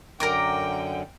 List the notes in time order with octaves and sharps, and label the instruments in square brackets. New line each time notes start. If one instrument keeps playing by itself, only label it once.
[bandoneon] F#2 D3 [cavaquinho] A#4 A#5 D6 [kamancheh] G5